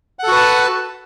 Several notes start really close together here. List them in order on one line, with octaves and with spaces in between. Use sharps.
F#5 A4 F#4 B4 A5